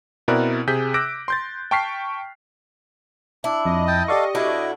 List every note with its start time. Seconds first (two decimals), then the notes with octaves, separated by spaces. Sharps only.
0.28 B2 C4 E4 A#4 D5 F#6
0.67 C3 G#4 G6 B6
0.94 D6 E6 F#6 A#6 D7
1.28 C6 G6 A6
1.71 G5 A5 C#6 F6 B6 C7
3.44 D4 E4
3.66 F2 D#5
3.87 G5 A5 D#6
4.08 G4 A4 D5 F5 C#6
4.35 A2 D4 E4 F#4